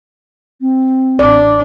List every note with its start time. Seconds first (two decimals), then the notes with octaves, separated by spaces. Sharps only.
0.61 C4
1.19 A1 D4 D5